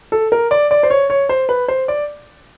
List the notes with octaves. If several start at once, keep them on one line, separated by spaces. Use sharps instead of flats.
A4
A#4
D5
D5
C5
C#5
C#5
C5
B4
C5
D5